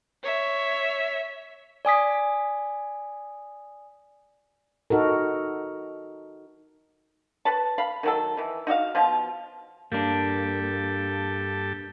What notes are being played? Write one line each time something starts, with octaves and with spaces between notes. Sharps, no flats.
C#5 E5
D5 G#5 D#6 B6
D#4 F#4 A4 A#4
B4 C#5 A5
F5 B5
D#3 F#3 A4
D#3 E3
D#4 F#4 D#5 F5
B2 F3 F4
G2 A#3 D4 G4 A4